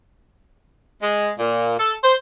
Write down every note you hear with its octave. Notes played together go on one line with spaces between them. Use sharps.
G#3
A#2
A4
C5